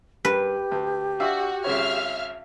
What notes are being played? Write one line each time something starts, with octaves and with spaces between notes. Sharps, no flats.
G2 G4 B4
D2
D4 F#4 E5 F5
G#1 C#3 C#5 E5 F5 F6